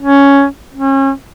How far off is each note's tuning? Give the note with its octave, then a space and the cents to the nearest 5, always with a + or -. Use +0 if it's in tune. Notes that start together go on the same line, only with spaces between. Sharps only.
C#4 +5
C#4 -35